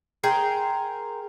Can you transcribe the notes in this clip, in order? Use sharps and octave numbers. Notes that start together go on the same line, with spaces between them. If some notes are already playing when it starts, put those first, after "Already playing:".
G#4 A#4 C5 G5